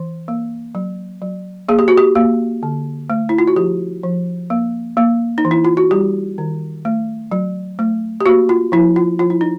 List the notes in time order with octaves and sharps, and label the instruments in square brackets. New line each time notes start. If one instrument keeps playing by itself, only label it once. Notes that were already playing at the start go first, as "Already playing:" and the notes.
Already playing: [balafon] E3
A#3
F#3
F#3
A#3 G#4
G4
F#4
G4
A#3
D3
A3
E4
F4
F#4
F3 G4
F3
A#3
A#3
D#4
E3
E4
F4
F#4
G3 G4
D#3
A3
F#3
A3
G4
A#3 F#4
F4
F3 E4
F4
F3 F4
E4
D#4